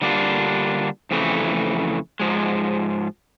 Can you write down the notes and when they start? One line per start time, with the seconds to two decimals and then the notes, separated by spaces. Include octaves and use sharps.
0.02 D3 G3 A#3 D4 F4
1.11 F2 C#3 E3 A3
2.20 G#2 F3 G#3